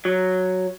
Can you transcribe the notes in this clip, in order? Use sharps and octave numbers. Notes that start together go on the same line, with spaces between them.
F#3